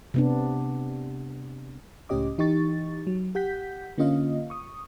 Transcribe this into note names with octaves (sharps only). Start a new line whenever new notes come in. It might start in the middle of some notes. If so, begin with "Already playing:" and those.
C3 B3 D4
C#2 A2 C#4 G4 D#5 D6
E3 D#4 G4 C#6 A6
F#3
G4 F#5 G6 B6
D3 A#3 C#4 F4 D#5 F5
C#6 D#6